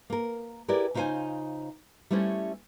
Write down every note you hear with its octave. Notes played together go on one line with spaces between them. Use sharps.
A#3 A#4
E4 G4 G#4 A#4 B4 D5
C#3 D#4 F4 G4 C5 G#5
G3 A3 C#4 E4 C5